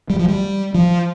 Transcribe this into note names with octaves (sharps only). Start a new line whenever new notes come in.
G3
F3
G3
F3